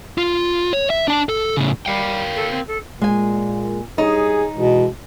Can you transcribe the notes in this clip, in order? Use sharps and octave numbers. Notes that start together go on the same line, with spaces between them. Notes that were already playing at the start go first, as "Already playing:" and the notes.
F4
C#5
E5
D4 A5
A4
A2 C#3
G3 A#4 F5 G5
A4
C4
A4
A#2 G#3 G#5
G3 D#4 G#4 C#5
B2 E3 G#3